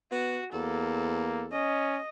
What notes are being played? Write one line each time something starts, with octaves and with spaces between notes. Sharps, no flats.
B3 F#4
E2 A#3 A4
C#4 D#5